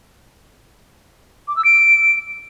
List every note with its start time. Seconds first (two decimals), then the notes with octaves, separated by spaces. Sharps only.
1.48 D6
1.56 E6
1.65 D7